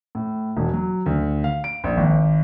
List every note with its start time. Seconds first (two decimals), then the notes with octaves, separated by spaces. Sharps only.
0.15 A2
0.57 E1
0.74 F#3
1.06 D2
1.44 F5
1.64 D7
1.84 A#1
1.97 G#1